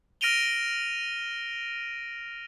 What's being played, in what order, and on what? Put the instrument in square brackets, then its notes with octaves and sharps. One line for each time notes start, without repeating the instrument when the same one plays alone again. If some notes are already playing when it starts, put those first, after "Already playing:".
[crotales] F6 A#6 D7 D#7 F7 G7